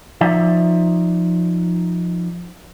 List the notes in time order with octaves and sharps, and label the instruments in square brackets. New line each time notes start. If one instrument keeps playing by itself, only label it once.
[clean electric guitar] F3 D#4 D5 E5